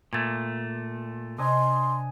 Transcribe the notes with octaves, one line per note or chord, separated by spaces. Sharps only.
A#2 A3 G#6 A6
C3 D4 D#5 G#5 C6